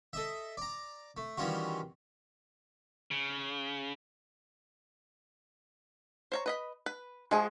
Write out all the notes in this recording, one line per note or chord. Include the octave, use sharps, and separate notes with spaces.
A4 D#5 E5
D5 A#5
A3
D#3 E3 G3 C#4 F4 F#4
C#3
C5 C#5 A#5
B4 D#5 B5
B4
F3 G#3 F#4 G#4